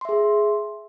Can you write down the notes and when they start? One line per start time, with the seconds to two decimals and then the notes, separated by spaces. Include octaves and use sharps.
0.01 C6
0.05 E5
0.09 G#4